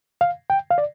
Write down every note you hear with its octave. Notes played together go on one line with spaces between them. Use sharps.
F5
G5
F5
D5